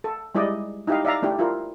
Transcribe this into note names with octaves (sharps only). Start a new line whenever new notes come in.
A4
G3 G#3 E4 D5 D#5
D#4 E4 G4 D#5 F5
D5 E5 F5 A#5
A3 D4 E4 G4
E4 F4 A#4